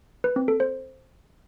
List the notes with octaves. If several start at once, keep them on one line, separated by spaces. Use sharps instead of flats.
B4
C4
A4
C5